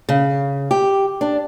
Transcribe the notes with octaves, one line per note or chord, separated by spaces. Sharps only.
C#3
G4
D4